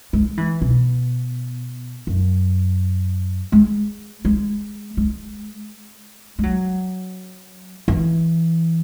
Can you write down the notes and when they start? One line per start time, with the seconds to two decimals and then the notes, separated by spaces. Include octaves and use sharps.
0.13 G#3
0.37 E3
0.62 B2
2.07 F#2
3.52 G#3
4.25 G#3
4.97 G#3
6.39 G#3
6.43 F#3
7.88 E3